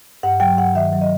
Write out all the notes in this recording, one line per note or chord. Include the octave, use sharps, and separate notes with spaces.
G2 F#5
F#3 G5
G2 F#5
D#3 E5
F#3
D#5